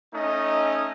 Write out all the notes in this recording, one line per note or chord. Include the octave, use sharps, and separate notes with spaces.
A3 C#4 D#4 D#5